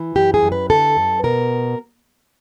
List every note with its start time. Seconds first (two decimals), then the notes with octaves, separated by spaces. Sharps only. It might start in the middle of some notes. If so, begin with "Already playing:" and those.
Already playing: E3
0.16 F#2 G4
0.34 G#4
0.43 F#2
0.52 B4
0.70 D3 A4
0.97 F#2
1.24 B2 A#4